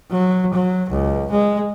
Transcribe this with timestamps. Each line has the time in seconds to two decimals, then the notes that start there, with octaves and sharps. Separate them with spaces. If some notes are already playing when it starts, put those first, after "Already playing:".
0.11 F#3
0.54 F#3
0.91 C#2
1.31 G#3